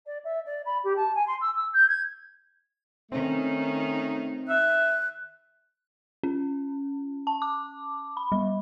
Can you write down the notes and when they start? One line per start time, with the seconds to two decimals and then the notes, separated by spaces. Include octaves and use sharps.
0.06 D5
0.24 E5
0.45 D5
0.65 B5
0.83 G4
0.96 A5
1.14 G#5
1.27 C6
1.41 E6
1.55 E6
1.73 G6
1.88 G#6
3.12 D#3 A3 C4 C#4 D#4
4.48 E5 F#6
6.23 C#4
7.27 A5
7.42 D6
8.17 B5
8.32 G3